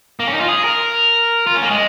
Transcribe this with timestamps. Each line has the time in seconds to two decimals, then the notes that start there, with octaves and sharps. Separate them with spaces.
0.20 A#3
0.27 C#4
0.34 D#4
0.40 F4
0.48 G#4
0.64 A#4
1.47 F4
1.55 C#4
1.63 A#3
1.70 G#3